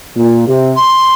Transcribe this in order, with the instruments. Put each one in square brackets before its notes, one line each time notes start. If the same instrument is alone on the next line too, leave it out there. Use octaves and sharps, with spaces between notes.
[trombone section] A#2
C3
[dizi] C6